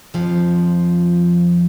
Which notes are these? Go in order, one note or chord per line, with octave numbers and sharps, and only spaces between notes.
F2 F3